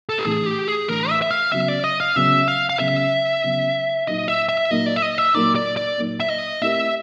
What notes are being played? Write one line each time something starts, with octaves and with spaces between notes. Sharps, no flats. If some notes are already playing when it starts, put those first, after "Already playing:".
A4
G4
A2 E3 A3 D4 G#4
G4
G#4
A2 E3 A3 D4 A#4
E5
E5
F5
C#3 F#3 B3 E5
D5
D#5
F5
C#3 F#3 B3 E5
F5
F5
C#3 F#3 B3 E5
C#3 F#3 B3
A#2 F#3 A#3 D#4 D#5
E5
E5
A#2 F#3 A#3 D#4 D#5
D5
E5
D#5
E5
A#2 F#3 A#3 D#4 D5
D5
D5
A#2 F#3 A#3 D#4
E5
D#5
A3 C4 E4 G4 A#4 E5